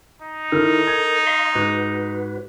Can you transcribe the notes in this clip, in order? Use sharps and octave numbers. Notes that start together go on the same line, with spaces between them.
D#4
D#3 E4 A4 A#4
G#6
D#5 F5 C6
G#2 F#4 B4 D6